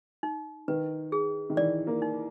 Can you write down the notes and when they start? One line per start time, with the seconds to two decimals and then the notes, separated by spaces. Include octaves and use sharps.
0.23 D#4
0.68 D#3 B4
1.12 G#4
1.50 D#3
1.57 E3 D5
1.87 A#3
2.02 D#4